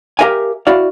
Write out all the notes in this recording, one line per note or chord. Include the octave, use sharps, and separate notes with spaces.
G4 G#4 A#4 E5 F5 G#5
E4 F#4 D5 F5